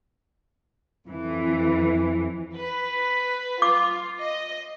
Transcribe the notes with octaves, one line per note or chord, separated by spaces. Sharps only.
F2 E3
B4
F4 D6
D#5